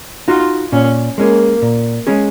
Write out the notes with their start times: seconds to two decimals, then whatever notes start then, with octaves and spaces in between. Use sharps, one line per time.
0.28 D#4 F4 F#4
0.72 A#2 C#4
1.17 G#3 A#3 C#4 G#4
1.62 A#2
2.07 G#3 C#4 G#4